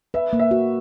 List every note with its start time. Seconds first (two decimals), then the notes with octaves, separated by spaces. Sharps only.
0.14 B4 E5
0.33 A#3
0.39 E5
0.51 F#4